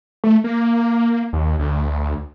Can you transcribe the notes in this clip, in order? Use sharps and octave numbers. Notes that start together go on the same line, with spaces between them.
A3
A#3
D#2
D2